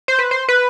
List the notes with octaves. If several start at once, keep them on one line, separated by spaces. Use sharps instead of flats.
C5
B4
C5
B4